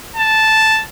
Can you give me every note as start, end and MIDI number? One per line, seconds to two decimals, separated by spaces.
0.16 0.83 81